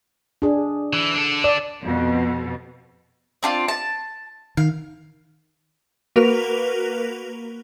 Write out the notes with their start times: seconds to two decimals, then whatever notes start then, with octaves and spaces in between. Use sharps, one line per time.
0.42 D4 G#4
0.93 E3
1.14 D4 A4
1.44 D5
1.83 F2 B2
3.43 C4 D4 F4
3.68 A5
4.57 D#3 F5
6.16 A#3 F#4 A#4 B4 F7